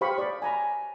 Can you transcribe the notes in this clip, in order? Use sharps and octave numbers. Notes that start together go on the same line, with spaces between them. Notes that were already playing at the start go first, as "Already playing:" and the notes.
G4 C5 F5 B5 C#6 D#6
C#5 D5
G#5 A#5 B5